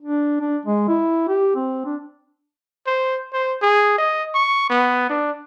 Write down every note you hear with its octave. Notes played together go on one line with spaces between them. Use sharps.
D4
D4
G#3
E4
G4
C4
D4
C5
C5
G#4
D#5
C#6
B3
D4